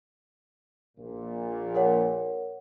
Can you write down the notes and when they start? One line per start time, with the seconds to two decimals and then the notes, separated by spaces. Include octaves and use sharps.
0.98 A#1 A#2
1.75 A#4 C#5 F#5